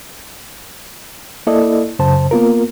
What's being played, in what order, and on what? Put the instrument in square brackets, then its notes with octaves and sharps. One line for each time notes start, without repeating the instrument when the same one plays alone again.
[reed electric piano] A#3 E4 A4 D5 D#5
F#2 C#3 C5 A5
A#3 B3 F4 A#4